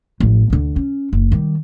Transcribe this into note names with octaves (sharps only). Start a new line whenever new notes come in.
A1 F3
D2 D3
C#4
F#1
D#3 G3